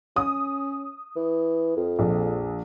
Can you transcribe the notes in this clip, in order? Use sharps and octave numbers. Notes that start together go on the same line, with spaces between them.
C#4 D#6
E3
F2
A#1